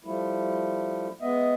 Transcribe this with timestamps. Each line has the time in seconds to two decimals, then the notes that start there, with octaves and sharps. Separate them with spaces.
0.05 F3 G3 A3 E4
1.21 G#3 B3 D#5 E5